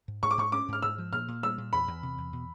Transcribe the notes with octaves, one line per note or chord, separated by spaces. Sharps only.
G#2
G#2 C#6
D6
G#2 C#6
C#4 D6
G#2 F6
G#2 E6
F3
A#2 F6
A#2
G3 E6
A#2
E2 B5
E2
C3
E2
B2